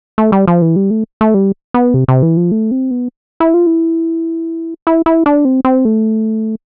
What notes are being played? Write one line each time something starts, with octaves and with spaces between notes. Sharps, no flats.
A3
G3
F3
E3
G3
A3
A3
G3
B3
C3
C3
E3
F3
A3
C4
B3
E4
F4
E4
E4
E4
D4
C4
C4
A3